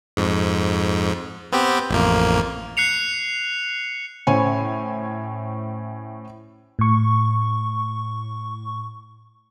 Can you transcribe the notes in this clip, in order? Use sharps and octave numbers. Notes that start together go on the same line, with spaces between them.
F2 G#2
B3 C4 G4
A1 F2 A#3
F#6 C7 C#7 F7
A2 C#4 C5 C#5 G#5
A2 C#6